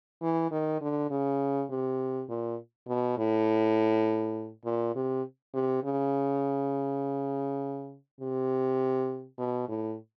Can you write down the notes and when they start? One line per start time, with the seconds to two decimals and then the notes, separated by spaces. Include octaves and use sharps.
0.22 E3
0.51 D#3
0.81 D3
1.10 C#3
1.70 C3
2.29 A#2
2.88 B2
3.18 A2
4.65 A#2
4.96 C3
5.54 C3
5.84 C#3
8.21 C3
9.38 B2
9.69 A2